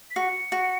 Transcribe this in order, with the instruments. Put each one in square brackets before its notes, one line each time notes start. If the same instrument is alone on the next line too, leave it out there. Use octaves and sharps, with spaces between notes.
[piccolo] B6
[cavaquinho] F#4 [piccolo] C#7
[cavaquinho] F#4